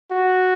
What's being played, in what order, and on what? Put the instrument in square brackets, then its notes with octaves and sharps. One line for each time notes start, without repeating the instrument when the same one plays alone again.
[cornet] F#4